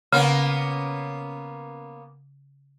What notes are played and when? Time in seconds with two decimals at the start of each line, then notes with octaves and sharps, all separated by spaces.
0.12 C#3 A#3 B3 C#4